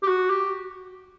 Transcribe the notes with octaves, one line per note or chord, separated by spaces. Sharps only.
G4
F#4
G4